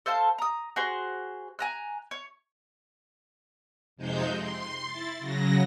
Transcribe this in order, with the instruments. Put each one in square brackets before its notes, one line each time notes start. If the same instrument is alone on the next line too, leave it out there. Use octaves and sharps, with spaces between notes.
[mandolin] A4 C5 F5 A5
A#5 D#6
F#4 G#4 C5
G#5 A#5 F#6
C#5
[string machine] F2 C3 G#3 C4 D#4 G6
C6
E4 A6
C#3 F#3 A#6